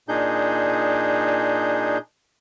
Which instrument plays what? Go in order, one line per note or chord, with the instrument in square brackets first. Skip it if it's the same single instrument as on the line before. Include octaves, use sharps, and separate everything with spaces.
[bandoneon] A#2 D4 D#4 G#4 G6